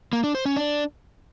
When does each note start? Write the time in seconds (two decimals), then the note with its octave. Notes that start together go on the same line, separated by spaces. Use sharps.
0.13 A#3
0.24 D4
0.35 C5
0.46 C#4
0.56 D4